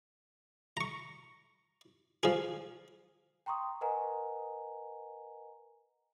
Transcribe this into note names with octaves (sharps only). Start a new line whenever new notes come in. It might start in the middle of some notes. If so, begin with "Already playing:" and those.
A#5 C#6
F3 G#4
G5 A#5 C6 C#6 D#6
A#4 B4 D#5 F#5 G#5 A#5